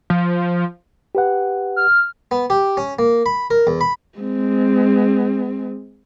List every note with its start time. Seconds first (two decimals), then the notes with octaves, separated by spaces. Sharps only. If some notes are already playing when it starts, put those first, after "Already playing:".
0.10 F3
1.15 G4 B4 F#5
1.76 F6
2.31 B3
2.50 G4
2.77 C#4
2.99 A#3
3.26 B5
3.51 A#4
3.67 E2
3.81 B5
4.18 G#3 C4